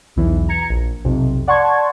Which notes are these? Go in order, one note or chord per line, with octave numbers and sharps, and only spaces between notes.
B1 E2 E3
A#5 G#6 C#7
A#1
B1 F2 C3
D5 F#5 A5 C6 C#6 G#6